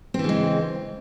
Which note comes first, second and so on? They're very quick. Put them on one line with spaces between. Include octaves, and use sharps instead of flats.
C4 E3 C#3 G#3